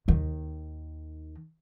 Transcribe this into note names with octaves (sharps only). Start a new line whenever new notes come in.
D#2 D#3